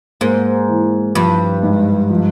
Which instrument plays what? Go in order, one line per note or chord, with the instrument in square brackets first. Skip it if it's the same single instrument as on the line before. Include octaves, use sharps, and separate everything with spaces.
[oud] G#2 [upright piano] A#3
[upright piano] E3
[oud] G2 [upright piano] F3
[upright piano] G#2
F3